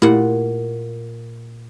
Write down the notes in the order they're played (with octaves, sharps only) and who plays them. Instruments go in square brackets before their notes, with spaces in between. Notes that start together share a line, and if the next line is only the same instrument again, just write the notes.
[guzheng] A#2 F#5 [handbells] A3 E4 G4